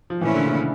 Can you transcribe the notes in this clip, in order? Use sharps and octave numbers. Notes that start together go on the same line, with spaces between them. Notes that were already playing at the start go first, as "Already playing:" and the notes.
F3
A#2 E3 F3 A3 C#4 E4
D3
C#3
D3